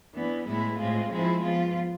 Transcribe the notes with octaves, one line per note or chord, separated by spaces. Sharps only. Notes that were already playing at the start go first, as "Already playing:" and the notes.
E3 B3 D4
A2 G#3 B3 E4
A2 G#3 C4 F4
F3 G#3 C4 E4
F3 B3 F4